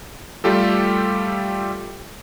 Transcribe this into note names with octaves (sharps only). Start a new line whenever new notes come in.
G3 A3 F4 G4 A4